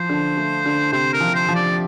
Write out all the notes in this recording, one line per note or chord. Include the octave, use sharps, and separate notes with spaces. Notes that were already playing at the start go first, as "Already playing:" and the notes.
Already playing: F3 C5
D3
A3
D3
C3 C5
A#4
F3
C5
F3
D5